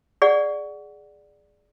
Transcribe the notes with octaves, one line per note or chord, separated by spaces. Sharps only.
G#4 D5 F#5